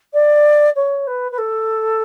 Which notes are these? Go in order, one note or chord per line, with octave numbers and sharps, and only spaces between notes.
D5
C#5
B4
B4
A4